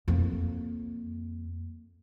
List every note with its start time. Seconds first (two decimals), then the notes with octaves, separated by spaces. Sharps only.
0.08 F2 A#3